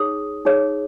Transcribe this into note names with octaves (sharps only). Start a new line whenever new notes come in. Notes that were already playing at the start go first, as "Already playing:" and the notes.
Already playing: D#4 G#4 C#5 D#6
D#4 G#4 C#5